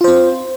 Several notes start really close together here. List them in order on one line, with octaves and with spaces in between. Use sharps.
F4 C5 C4